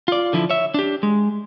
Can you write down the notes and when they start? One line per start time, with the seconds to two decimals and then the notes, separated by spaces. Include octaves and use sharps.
0.08 F4 D5
0.33 D3 F3 E4
0.50 C#5 E5
0.74 D4 G4
1.03 G#3